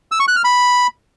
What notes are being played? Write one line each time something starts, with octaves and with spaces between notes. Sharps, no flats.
E6
C#6
F#6
F6
B5